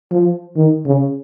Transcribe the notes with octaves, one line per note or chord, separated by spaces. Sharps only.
F3
D#3
C#3